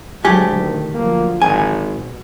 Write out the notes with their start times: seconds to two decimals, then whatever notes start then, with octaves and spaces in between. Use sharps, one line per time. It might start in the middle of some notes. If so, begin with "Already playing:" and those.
0.25 D2 A#2 F#3 G#3 A3 G4 G#5
0.55 B2 D3 D#3
0.94 D3 F3 F#3 A#3
1.42 G#1 G#5
1.91 B2